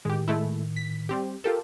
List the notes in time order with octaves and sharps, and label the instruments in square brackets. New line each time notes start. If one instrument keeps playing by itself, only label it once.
[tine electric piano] A2 D#3 [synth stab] G#3 G4
[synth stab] G#3 A3 E4
B6
G3 C4 G4
[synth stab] F4 G4 A4 [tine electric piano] A#4